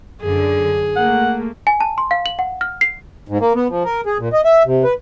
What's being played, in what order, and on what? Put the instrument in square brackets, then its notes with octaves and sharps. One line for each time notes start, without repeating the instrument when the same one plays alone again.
[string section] F#2 D3 [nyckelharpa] G#4
[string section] A3 A#3 [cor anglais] F#5
[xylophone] G#5
A5
C6
F5
F#7
F#5
F6
C7
[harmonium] G#2
A#3
B3
F3
A#4
G#4
A#2
D#5
E5
C3
B4